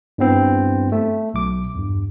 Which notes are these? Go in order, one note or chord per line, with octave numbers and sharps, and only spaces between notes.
G2 G3 B3 C4 E4
A3
B1 D6
E2 G2